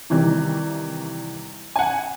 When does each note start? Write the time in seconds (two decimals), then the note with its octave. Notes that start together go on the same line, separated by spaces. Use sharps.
0.10 C3 D#3 E3 G3
1.76 F#5 G#5